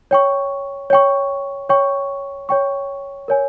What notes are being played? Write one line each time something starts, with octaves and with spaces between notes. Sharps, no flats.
C#5 G5 C#6
C#5 G5 C#6
C#5 G5 C#6
C#5 G5 C#6
A#4 C#5 G#5